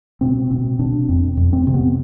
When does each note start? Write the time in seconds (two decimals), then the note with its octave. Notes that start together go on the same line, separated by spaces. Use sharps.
0.21 B2 C4
0.51 B2 C4
0.79 B2 D4
1.08 F2 C4
1.37 F2
1.53 C4
1.67 C3
1.74 B3